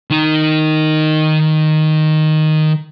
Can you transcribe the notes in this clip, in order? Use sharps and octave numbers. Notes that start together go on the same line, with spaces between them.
D#3 D#4